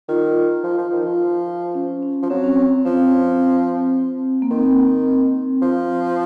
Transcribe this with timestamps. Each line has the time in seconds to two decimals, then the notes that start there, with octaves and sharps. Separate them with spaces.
0.09 D#3 F4
0.64 F3
0.78 F3
0.93 D#3
1.06 F3
1.75 C#4
2.03 C#4
2.23 F3
2.30 F#3 C4
2.44 C#4
2.56 C4
2.85 F3 C4
4.42 A#3
4.51 D#3 C4
5.62 F3